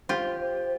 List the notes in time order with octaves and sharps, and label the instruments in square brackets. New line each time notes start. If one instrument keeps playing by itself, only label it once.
[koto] F4 G4 [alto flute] C5
[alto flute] C5